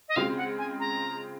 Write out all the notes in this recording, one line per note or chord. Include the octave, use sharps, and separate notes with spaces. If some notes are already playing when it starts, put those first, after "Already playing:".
D#5
C#3 G#3 C4 F4 F5
F#5
G#5
A#5